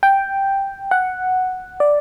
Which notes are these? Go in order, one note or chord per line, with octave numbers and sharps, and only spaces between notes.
G5
F#5
D5